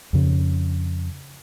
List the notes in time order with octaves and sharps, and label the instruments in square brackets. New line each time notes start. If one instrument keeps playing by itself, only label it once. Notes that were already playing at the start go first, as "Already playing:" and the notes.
[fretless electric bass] F2 C#3